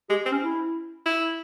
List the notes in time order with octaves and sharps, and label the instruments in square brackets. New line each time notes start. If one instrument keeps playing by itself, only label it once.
[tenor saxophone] G#3 [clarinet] G4
[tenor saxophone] C4
[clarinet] C#4
E4
[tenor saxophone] E4